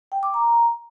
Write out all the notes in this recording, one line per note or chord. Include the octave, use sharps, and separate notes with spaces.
G5
D6
A#5